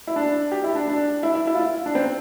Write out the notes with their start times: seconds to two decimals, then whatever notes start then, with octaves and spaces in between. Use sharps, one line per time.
0.07 E4
0.16 D4
0.52 G4
0.64 E4
0.75 D4
0.88 D4
1.23 E4
1.35 E4
1.47 E4
1.55 F4
1.59 E4
1.86 D4
1.95 C4